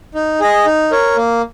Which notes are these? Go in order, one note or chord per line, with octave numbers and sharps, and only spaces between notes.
D#4
G#4 D#5
D#4
A#4 C#5
A#3